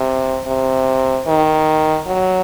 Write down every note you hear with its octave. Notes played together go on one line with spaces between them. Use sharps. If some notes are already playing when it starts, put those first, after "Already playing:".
Already playing: C3
C3
D#3
F#3